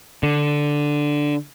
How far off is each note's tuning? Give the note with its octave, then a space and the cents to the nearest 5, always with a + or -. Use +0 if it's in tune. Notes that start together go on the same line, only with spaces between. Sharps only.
D3 +0